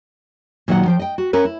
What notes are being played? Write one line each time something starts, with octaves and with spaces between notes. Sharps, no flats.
A#2 D#3 F#3 C#5 D#5 F#5
F3 C5 G5
D#5 G5
F#4
C#4 A#4 B4
E4